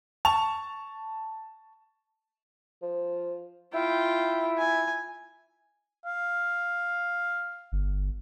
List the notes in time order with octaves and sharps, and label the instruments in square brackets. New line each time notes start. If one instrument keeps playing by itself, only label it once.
[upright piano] A5 C#6 F7
[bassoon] F3
[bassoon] E4 [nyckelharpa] F4 G5
[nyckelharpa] G#5
[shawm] F5
[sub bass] G1